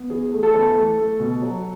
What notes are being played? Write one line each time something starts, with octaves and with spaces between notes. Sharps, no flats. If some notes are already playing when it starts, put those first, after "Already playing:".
Already playing: B3
E2 G#4
A3
A4
E2
A3
A3
B2
F#3